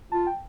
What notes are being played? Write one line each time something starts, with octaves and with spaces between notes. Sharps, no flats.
F4 A5
G5